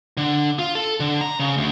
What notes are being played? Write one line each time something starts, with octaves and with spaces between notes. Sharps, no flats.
D3
F4
A4
D3
A#5
C#3
D2